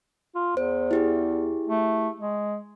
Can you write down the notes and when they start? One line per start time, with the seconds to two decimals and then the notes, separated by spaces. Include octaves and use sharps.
0.35 F4
0.57 E2 C5
0.91 E4 G4 G#4
1.67 A3
2.20 G#3